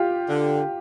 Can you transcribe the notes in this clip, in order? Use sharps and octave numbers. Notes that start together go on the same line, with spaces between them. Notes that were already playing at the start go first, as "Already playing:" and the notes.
Already playing: F4 G4
D3